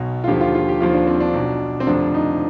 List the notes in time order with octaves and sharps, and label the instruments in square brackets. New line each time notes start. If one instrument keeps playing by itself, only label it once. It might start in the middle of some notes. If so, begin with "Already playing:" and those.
Already playing: [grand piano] B1 B2
F4
D#2 D3 F3 G4
F4
F4
G4
D#2 D3 F3 F4
D4
C4
D4
B1 B2
C4
F1 F2 D3 F3 D4
D#4